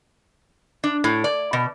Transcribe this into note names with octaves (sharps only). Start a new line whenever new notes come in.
D4
A2
D5
B2